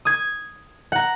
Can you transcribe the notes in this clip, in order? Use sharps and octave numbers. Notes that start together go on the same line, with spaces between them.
D#6 G#6
F#5 A#5